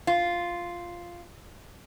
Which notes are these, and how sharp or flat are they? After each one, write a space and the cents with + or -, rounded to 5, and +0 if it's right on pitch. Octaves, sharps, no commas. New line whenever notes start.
F4 -5